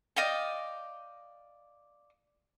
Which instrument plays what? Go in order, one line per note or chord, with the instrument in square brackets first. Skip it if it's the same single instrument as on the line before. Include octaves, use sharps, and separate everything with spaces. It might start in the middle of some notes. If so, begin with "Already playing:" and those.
[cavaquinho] D5 D#5 F5 G5